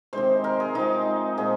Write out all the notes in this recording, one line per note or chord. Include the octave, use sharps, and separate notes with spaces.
C3 D#3 G#3 C5
A#4
G#4
C3 F3 G#3 D#4
A#2 F3 G#3 G#4